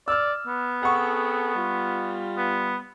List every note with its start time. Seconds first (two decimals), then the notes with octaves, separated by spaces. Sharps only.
0.08 D5 E6 F6
0.47 B3
0.83 C4 G#4 A4 F#5 C#6
1.55 G3 F4
2.37 B3